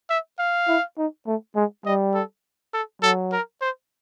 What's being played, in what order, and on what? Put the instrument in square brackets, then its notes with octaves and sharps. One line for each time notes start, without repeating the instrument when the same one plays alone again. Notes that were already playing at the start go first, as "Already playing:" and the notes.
[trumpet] E5
F5
[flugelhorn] E4
D#4
A3
G#3
[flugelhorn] G3 [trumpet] D#5
[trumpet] A4
A4
[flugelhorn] F#3 [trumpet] A4
[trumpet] A#4
C5